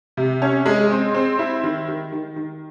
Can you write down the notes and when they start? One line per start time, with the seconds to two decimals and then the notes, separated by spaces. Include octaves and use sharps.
0.17 C3
0.42 C#4
0.66 G#3
0.91 C4
1.14 C4
1.39 E4
1.63 D#3
1.88 D#3
2.12 D#3
2.36 D#3